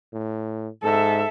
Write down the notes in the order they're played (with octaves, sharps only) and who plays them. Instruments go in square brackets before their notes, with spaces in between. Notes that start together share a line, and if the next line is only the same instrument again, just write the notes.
[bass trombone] A2
[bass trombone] G#2 [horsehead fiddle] A4 E5